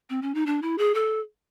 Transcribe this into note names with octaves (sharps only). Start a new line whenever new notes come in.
C4
C#4
D#4
D4
E4
G#4
A4